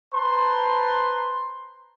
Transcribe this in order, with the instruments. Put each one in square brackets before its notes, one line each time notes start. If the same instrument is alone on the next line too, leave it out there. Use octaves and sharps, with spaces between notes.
[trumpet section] B4 C5 A5 A#5 C6